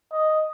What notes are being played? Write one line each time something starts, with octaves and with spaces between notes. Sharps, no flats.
D#5